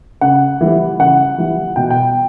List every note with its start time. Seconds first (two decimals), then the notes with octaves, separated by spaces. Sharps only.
0.21 C#3 F#5
0.61 E3 G3
0.99 C#3 F#5
1.38 E3 G3
1.76 B2 G5
1.90 G5